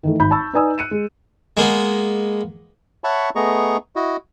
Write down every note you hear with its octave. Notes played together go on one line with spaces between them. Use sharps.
D#3 E3 A3
G#1 B5 G6
A5 B5 C#6 E6 A6
D#4 B4 D5 G#5 D#6 E6
F#6 C#7 D#7 E7
G#3
G#3 A#3 B3
C#5 E5 F#5 A5 B5 C#6
A3 B3 G#4 D#5 A#5 C#6
E4 F#4 D#5